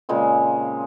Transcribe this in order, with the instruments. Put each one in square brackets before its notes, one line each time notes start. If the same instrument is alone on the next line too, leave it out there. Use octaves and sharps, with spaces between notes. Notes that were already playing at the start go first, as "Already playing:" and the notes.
[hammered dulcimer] A#2 C#3 G#3 C4